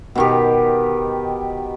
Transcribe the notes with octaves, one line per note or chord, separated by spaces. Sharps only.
B2 D#3 G4